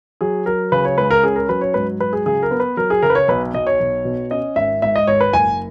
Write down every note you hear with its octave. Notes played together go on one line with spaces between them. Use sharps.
F#3 G#4
F#3 A#4
C#3 B4
C#5
C#2 B4
A#4
C#4 G#4
A#4
F#3 B4
C#5
G#2 B4
F#3 B4
G#4
C#3 G#4
A#4
B3
B4
F#3 A#4
G#4
C#3 A#4
B4
C#5
B1 B4
B1 D#5
C#5
B1
B2
C#4 D#5
G#1 E5
G#2 E5
D#5
G#1 C#5
B4
F#1 G#5